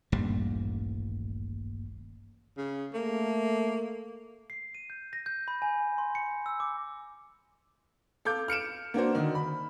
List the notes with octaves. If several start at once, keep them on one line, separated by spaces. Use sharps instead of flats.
D#1 A1 G2 G3 A#3
C#3
A3 A#3
C7
D#7
G6
A#6
G6
B5
G#5
C6
C#7
E6
D6
A4 F5 D6 G6
F6 C#7 D7 E7
A#3 D4 F#4 C5
D3 D#3
B5